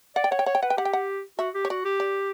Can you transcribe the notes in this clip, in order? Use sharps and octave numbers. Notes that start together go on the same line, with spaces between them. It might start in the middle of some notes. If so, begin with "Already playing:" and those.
D5 F#5
G5
C#5 F#5
G5
C#5 F#5
G5
B4 F#5
G5
G4 F#5
G5
F#5
F#4 E5
G4
C#5
F#4 D5
G4
D5